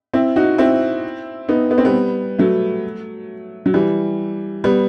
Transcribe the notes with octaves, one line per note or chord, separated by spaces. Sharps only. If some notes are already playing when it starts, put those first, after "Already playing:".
C4 E4
D#4 F#4
C4 E4
B3 D#4
B3
C4
G3 B3
F#3 A3
F#3
E3 G3
G3 B3